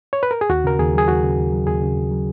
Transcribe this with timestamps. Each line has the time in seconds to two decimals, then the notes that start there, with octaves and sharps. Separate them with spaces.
0.13 C#5
0.23 B4
0.31 A#4
0.41 G#4
0.49 D#2 F#4
0.64 C#3 A#4
0.79 D#2 G#4
0.94 F#3 G#4
1.08 D#2 F#4
1.23 C#3
1.38 D#2
1.52 F#3
1.67 D#2 G#4
1.82 C#3
1.97 D#2
2.11 F#3